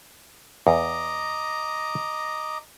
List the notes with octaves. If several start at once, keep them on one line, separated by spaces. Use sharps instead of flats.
E2 D#5 A#5 D6